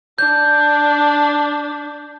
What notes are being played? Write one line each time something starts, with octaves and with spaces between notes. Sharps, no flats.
D4 G6